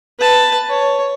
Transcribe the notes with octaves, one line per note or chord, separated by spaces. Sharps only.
B4 A5
C#5